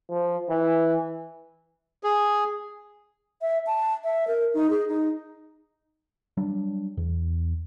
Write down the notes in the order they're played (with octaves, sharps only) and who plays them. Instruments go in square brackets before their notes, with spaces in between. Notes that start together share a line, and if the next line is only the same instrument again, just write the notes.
[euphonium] F3
E3
[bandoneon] G#4
[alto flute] E5
A5
E5
A#4
D#4
G#4
D#4
[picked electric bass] F#3 G3 D4
E2